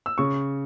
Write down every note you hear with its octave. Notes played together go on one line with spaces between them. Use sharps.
E6
C#3 C#6